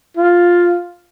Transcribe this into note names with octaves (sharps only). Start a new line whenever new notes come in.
F4